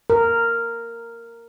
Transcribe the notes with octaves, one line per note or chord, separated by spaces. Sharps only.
A#4